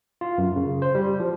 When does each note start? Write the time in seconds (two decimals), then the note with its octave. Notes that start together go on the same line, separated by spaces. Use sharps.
0.21 F4
0.38 F#2
0.56 C#3
0.82 C5
0.95 G3
1.20 F3